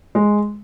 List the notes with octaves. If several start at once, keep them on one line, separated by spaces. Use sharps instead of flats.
G#3